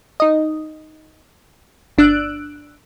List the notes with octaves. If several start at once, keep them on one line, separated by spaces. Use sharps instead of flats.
D#4 D#5
G1 D4 E6 F#6 D7